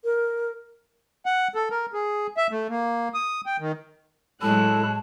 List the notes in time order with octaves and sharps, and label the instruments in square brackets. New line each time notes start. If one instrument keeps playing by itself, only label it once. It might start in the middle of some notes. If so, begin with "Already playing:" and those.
[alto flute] A#4
[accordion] F#5
A4
A#4
G#4
E5
A3
A#3
D#6
G5
D#3
[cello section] A2 F#3 G#3 [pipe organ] E4 A4 [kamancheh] C#5 F#6 [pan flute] A5